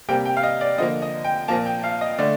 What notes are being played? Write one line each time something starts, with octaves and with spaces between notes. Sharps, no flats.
C3 G3 A#3 G5
G5
F5
D#5
D5
D3 F3 A#3 D#5
D#5
G5
A#2 F3 A#3 A5
G5
F5
D#5
D3 A3 D5